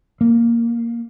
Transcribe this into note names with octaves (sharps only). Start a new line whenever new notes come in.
A#3